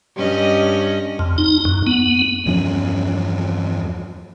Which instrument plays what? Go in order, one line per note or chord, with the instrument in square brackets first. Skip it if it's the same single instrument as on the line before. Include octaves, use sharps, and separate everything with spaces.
[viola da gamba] G2 C#4 D#5
[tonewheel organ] F2
D#4
F#2
B3
[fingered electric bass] E2 G2 F3 C#4